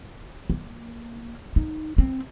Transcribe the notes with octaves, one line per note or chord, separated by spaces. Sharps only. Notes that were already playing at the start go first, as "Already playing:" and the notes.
A#3
D#4
C4